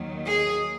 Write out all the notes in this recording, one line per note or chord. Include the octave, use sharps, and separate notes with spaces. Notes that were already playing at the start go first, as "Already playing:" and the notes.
Already playing: D#2 D#3 F#3
G#4